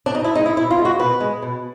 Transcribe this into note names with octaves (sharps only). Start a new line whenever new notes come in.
D4
B2 D#4
E4
G#3 D#4
E4
B2 E4
F4
G#3
F#4
B2 B4
G#3
B2